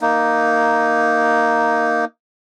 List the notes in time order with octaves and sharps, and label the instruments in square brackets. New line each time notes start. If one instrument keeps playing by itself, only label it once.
[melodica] A#3 D#4